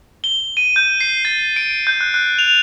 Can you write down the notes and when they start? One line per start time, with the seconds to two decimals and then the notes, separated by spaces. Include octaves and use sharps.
0.24 G7
0.57 D#7
0.76 G6
1.01 C7
1.25 A6
1.56 D7
1.87 G6
2.01 F#6
2.14 F#6
2.39 F7